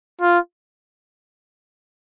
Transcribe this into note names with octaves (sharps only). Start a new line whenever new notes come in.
F4